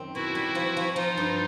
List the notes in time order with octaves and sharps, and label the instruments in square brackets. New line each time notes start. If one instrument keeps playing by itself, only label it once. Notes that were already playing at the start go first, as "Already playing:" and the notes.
Already playing: [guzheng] F#2 D#3 C4
[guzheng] B2 [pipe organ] E4 F#4
[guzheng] G3
F3
F3
[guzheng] F3 [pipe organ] D#4 F4
[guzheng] G2